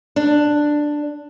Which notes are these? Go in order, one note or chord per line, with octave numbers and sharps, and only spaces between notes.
D4